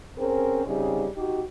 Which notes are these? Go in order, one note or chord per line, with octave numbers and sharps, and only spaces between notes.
C4 C#4 G#4 A#4 C5
C#3 G3 C4 D#4 G#4
D#4 F#4 G4